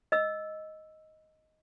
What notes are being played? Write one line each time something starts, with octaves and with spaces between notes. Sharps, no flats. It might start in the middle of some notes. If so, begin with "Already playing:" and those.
D#5 E6